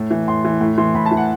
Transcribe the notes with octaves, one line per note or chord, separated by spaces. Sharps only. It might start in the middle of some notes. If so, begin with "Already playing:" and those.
Already playing: A2
E3
A2 C6
E3
A2
E3 C6
A2 B5
A5
E3
F#5